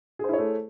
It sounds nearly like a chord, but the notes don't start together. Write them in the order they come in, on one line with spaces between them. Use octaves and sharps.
G#4 C5 E4 C#5 A3